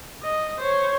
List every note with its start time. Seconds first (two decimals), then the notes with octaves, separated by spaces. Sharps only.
0.23 D#5
0.59 C5 C#5